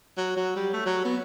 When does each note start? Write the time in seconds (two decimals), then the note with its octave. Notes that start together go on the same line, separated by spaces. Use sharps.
0.17 F#3
0.37 F#3
0.56 G3
0.73 A3
0.86 F#3
1.05 B3